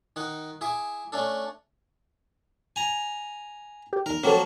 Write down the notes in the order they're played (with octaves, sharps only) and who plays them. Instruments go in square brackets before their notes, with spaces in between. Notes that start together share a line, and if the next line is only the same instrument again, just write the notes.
[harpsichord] D#3 D#4 F#5
E4 G#4 E5 D6
A3 C#4 D4 A4
G#5 A#5
[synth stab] G4
[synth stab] E2 D#3 [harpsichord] A#4
[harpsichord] F3 F#3 A#3 [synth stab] C#4 G4 A4